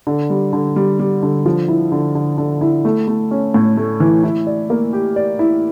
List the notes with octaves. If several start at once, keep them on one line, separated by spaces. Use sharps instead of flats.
D3
G3
D3
G3
G3
D3
F3
E4
D3
D3
D3
E4
A3
A3
C#4
A2
A3
E3
E4
D5
A#3
G4
D5
E4